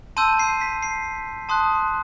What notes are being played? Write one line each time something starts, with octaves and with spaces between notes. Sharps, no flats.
A5 C6 E6 G6 D#7
C7
B6
C7
A5 C6 D#6 F#6